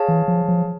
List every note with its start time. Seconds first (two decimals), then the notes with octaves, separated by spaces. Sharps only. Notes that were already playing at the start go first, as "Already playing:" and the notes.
Already playing: G#4 C#5 F5 A5
0.08 E3
0.28 F3
0.48 F3